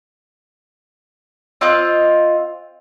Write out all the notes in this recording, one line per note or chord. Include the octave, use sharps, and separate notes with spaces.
C4 F4 D#5 F#6